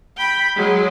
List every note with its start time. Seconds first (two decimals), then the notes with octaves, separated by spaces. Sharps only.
0.17 G5 B5
0.56 F#3 G#3